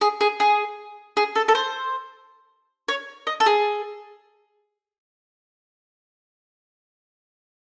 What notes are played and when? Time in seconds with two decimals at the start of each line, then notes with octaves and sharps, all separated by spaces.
0.01 G#4
0.21 G#4
0.40 G#4
1.17 G#4
1.35 A4
1.48 A4
1.55 C5
2.88 C#5
3.27 D#5
3.40 A4
3.46 G#4